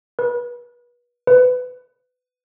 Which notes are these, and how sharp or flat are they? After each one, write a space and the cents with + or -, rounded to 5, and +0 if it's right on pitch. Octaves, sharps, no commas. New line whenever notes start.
B4 -30
B4 +25